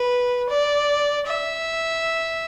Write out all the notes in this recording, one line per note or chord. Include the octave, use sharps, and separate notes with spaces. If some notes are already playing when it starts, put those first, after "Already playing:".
Already playing: B4
D5
E5